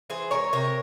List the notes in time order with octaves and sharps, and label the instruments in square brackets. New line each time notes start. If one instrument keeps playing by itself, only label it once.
[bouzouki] E3 G#4 C5
G#3 A#4 C#5
C3 A#4 C#5